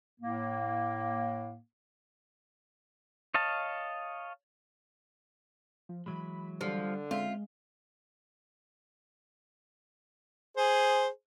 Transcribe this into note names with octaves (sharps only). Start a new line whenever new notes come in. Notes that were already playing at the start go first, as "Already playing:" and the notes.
A2 A#3
C#5 D#5 F5 A5
F3
E3 F#3 G#3 B5
D3 F3 G3
G#3 C4 C#4 F4 E5
G#4 C5